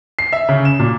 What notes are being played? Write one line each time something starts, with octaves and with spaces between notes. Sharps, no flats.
C7
E5
C#3
E7
A#2